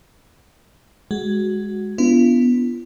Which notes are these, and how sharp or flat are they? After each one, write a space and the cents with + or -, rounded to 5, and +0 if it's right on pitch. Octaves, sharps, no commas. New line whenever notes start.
G#3 +0 F#4 +5
B3 +0 D4 -30 F4 -40